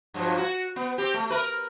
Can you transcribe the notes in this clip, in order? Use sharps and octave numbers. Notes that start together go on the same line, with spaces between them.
G2 F3 F#3
F#4
B3
C4 G4
A3
A#4 B4